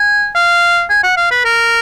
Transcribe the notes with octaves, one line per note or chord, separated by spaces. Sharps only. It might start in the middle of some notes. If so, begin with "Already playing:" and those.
Already playing: G#5
F5
G#5
F#5
F5
B4
A#4